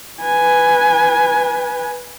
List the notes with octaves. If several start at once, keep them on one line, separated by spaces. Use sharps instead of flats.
B4 G#5